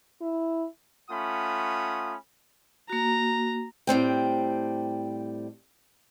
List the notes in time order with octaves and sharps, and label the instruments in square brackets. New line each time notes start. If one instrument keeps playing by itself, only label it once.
[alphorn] E4
[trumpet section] A3 C#4 F4 F#5 B5 D#6
[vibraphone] A#3 F#4 [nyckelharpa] A#5
[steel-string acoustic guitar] A2 G3 C4 G5